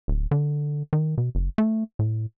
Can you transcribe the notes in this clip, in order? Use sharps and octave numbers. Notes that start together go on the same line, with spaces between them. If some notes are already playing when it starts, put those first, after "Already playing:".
D1
D3
D#3
B2
F#1
A3
A2